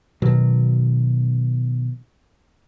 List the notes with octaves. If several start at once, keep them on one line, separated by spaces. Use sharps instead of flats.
B2 D#3 F#3